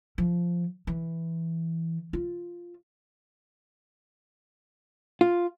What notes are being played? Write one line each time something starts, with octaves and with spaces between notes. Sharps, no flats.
F3
E3
F4
F4